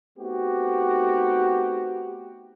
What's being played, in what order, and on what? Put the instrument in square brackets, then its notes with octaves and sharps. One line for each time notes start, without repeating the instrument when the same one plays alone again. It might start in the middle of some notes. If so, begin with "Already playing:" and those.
[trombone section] A3 B3 C4 D#4 F#4 G4